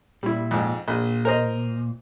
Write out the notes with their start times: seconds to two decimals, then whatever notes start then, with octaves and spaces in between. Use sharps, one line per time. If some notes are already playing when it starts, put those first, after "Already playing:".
0.23 A#2 G3 E4
0.51 F2 G#2
0.88 A#1 A#2
1.25 A#4 C5 D#5